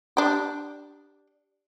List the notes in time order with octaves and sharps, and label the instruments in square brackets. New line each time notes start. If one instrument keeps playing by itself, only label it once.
[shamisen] D4 G4